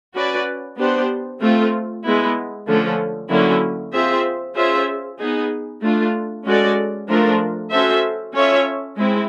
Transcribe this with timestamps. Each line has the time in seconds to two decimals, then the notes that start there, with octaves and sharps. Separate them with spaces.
0.15 C#4 F#4 B4 D5
0.78 B3 D4 G4 C5
1.41 A3 C4 F4
2.04 G#3 B3 E4
2.67 D3 F3 A3 C#4
3.30 D3 F#3 A#3 C#4 E4
3.93 C4 F4 G#4 C5 E5
4.56 C#4 F4 G#4 C5 E5
5.18 B3 D#4 G#4
5.82 A3 D4 F4
6.45 G#3 C#4 F#4 A4 D5
7.08 F3 A3 D4 F4 A#4
7.71 C#4 F#4 A4 C5 E5
8.34 C#4 F4 A4 C#5 E5
8.97 G#3 C4 E4